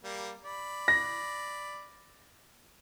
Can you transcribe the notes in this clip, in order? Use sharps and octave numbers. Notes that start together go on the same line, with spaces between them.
G3 A#3
D5 B5
A#6